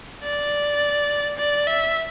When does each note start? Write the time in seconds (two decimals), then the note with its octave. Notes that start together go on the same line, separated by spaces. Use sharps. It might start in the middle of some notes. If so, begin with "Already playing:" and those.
0.23 D5
1.38 D5
1.67 E5